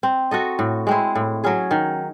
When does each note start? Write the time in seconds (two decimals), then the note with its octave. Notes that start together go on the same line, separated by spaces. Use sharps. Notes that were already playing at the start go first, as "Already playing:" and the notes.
0.03 C4
0.31 F#4 A4 D#5
0.59 A2
0.87 G#3 C4 E4
1.15 A2
1.44 F#3 C#4 G#4
1.71 D#3